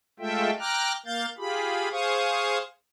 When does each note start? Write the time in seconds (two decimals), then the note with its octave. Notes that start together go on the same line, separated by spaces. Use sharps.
0.20 G#3 A3 F4 A4 E5 G5
0.59 G5 A#5 D6 F6 F#6
1.06 A#3 F5 G6 A6
1.38 F4 G4 G#4 B5
1.92 G#4 C5 F5 C#6 D#6